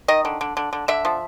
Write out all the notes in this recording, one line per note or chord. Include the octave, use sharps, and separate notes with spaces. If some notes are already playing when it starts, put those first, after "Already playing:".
D#3 D#5
D3
D3
D3
D3
D3 E5
F3